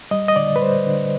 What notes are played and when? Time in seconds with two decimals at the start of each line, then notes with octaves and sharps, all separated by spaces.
0.11 G3 D#5
0.28 D#5
0.36 D3 D5
0.56 B4
0.61 G3 C5
0.86 D3